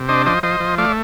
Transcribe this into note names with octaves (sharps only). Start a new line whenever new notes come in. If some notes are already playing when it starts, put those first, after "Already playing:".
Already playing: C3
D4 C5 D#5
F3 C5 D#5
F3 C5 D#5
F3
A3 D5 F5